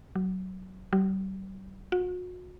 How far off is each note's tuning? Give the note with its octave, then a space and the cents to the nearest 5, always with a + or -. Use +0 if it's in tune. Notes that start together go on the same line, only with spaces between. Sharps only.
F#3 +15
G3 -40
F#4 -40